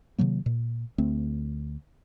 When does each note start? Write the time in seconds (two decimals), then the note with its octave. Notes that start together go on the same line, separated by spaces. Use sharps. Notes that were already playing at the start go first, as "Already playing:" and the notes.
0.18 C3 D#3 F#3 A#3
0.46 A#2
0.98 D2 A3 C4